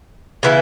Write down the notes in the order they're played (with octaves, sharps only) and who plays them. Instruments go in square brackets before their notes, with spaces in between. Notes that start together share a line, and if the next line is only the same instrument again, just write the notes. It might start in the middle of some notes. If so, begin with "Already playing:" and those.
[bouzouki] C#3 E3 B3 E4